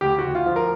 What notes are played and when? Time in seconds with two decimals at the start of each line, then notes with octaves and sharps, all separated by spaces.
0.01 D2 G4
0.19 F#4
0.24 D2
0.35 F4
0.46 F3
0.56 A#4